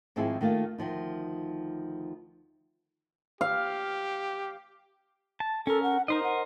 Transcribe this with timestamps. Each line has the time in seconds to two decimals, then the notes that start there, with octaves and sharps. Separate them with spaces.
0.16 G#2 D#3 F3 C4 E4 G#4
0.41 D#3 A3 A#3 F4
0.78 D2 D#3 F3 D#4
3.41 G4 F5
5.40 A5
5.67 C#4 A4 A#4
5.83 F#5
6.08 D#4 A#4 C5 D#5
6.23 F#5